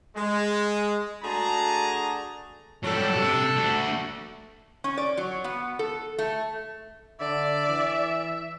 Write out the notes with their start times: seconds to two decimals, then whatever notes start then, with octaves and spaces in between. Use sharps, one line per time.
0.16 G#3
1.23 A3 D4 F#4 G#4 A5 A#5
2.84 F#3 G3 D4 A4
3.17 C3
3.57 A3 F#4
4.84 C#4
4.97 D5
5.17 F#3
5.44 B3
5.79 A4
6.18 A3
7.20 D3 D5 E5
7.68 E3